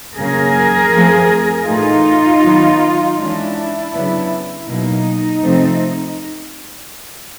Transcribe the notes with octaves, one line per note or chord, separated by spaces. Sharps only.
C#3 F#3 A#3 C#4 G#4 A#4
F3 A3 C4
A2 E3 A3 D#4 F4
D#3 F#3 B3
E3 G#3 C#4 D4 E4
C#3 F#3 B3 D4
B2 F#3 A#3 D#4
C3 F3 A3 C4